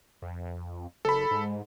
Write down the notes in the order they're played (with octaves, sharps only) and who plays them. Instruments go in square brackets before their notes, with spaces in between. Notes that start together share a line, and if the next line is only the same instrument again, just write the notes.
[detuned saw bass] F2
[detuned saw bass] F#1 [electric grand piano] A4 B5
[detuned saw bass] G#2